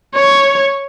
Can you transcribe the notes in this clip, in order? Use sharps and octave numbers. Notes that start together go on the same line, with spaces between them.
C#5